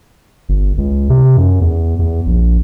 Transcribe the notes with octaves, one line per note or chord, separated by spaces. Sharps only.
G1
C#2
C3
F#2
E2
E2
A#1